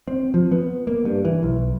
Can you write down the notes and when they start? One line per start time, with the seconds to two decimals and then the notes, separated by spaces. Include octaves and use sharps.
0.08 C4
0.34 F3
0.52 B3
0.87 A#3
1.05 G2
1.25 E3
1.43 B1